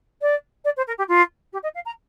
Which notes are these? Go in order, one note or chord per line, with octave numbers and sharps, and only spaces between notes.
D5
D5
C5
A#4
G4
F4
G4
D#5
F5
A#5